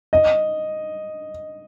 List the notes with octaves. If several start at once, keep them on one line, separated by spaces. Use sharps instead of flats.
D#5